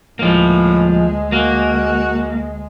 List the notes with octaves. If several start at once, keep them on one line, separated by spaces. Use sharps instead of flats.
D2 A2 F3 G#3 A#3
A#3 F#4